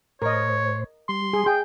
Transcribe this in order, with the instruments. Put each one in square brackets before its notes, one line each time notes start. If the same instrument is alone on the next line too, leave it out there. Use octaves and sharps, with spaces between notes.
[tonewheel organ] A2 C5 [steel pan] A#4 D#5 [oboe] C#5
[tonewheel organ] G3 [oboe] C6
[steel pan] G#4
[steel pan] G#4 [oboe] G5